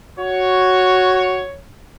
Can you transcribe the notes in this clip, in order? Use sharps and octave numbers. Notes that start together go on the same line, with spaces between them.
F#4 C#5